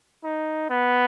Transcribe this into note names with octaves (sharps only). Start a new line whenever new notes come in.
D#4
B3